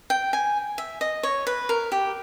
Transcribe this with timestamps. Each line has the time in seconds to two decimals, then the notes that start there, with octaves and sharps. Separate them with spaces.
0.10 G5
0.33 G#5
0.78 E5
1.01 D#5
1.23 C#5
1.47 B4
1.69 A#4
1.92 G4